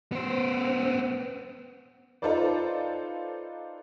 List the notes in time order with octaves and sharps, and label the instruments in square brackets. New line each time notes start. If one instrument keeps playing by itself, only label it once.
[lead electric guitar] B3 C5
[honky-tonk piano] D#4 F4 A4 B4 C5 D5